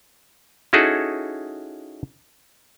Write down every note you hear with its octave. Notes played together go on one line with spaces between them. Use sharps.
C#4 D#4 E4 F#4 G#4 A4